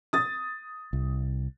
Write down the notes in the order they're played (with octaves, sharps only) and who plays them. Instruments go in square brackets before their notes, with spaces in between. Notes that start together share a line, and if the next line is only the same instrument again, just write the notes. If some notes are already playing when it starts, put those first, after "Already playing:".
[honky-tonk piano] D#6 A6
[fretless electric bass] C2